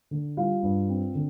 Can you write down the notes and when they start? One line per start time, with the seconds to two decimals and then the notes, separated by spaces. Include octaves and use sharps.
0.11 D3
0.37 G3 F4 F5
0.63 G2
0.89 C4
1.15 D3